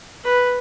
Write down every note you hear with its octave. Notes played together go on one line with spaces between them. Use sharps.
B4